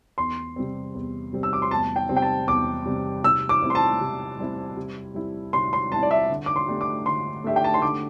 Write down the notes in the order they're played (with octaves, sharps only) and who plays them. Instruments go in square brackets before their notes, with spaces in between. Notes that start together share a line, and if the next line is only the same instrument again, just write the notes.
[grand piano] E2 [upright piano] C6
[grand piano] C3 G3 C4
E2
C3 G3 C4
[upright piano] E6
D6
C6
[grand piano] E2 [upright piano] A5
[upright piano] G5
[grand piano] C3 G3 C4
[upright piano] G5
A5
[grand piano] E2 [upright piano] D6
[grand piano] C3 G3 C4
[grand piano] C3 [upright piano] E6
[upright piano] D6
[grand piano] G3 C4 E4
[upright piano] C6
A5
[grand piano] C3
G3 C4 E4
C3
G3 C4 E4
[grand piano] C3 [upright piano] C6
[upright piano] C6
[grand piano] G3 C4 E4 [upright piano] A5
[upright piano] D5
E5
[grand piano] D3
[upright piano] D6
C6
[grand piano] A3 D4 G4
[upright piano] D6
[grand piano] D3 [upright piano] C6
[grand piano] A3 D4 G4 [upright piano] E5
[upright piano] G5
A5
C6
[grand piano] D3 [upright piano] D6